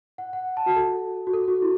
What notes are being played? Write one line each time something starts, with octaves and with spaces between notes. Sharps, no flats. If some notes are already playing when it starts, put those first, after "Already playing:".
F#5
F#5
A5
F#4
A4
F#4
A4
F#4
E4